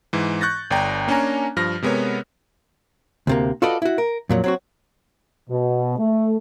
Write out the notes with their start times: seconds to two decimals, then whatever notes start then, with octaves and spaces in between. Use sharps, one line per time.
0.13 G#2 E3
0.41 C#6 F#6 G6 A6 A#6
0.71 G1 D5 G5 A#5
1.08 A#3 C#4 D4 C#5 G#5 A#5
1.56 G2 F3 F6 A#6
1.82 C3 G#3 B3 A#4 C#5
3.27 D2 C3 A#3
3.62 F4 F#4 A4 B4 D5 D#5
3.82 E4 F#4
3.98 A#4
4.29 F2 A#2 F#3
4.44 F#3 C4 F#4
5.50 B2
5.98 A3